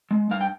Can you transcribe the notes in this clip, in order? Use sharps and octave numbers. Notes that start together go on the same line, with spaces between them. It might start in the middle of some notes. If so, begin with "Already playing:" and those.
G#3
G2 F5
G5